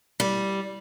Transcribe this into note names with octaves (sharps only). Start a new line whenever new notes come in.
G3